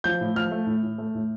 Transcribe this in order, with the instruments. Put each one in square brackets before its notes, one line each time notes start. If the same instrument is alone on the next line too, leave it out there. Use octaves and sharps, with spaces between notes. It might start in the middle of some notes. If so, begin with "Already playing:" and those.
[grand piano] F3 G6
A2
F3 F6
A3
A2
A2
A3
A2